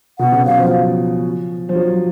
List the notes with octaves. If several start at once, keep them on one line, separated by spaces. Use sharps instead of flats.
B2 F#5
C#3
F#3 F5
F3
F3
F#3